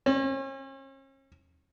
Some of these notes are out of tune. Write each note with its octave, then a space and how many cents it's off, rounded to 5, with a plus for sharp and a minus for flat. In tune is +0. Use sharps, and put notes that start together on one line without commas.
C#4 -40